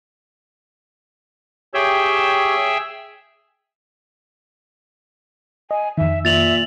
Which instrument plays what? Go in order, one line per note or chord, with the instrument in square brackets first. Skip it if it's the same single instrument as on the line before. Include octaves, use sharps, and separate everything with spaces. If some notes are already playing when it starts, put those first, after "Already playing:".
[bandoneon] G4 C#5 [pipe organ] G#4 E5 G5
[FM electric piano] D#5 [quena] G#5
[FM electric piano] F2 D#3 [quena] E5
[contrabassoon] A#2 [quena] E5 [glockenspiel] A6 F7 F#7